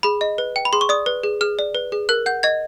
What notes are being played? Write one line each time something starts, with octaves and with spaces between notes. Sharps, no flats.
G#4 B5
D#5
B4
G5
B5
G#4 C6
C#6
D5 D#6
B4
G#4
G#4 F6
D5
B4
G#4
A#4 F#6
F#5 G6
D#5 G#6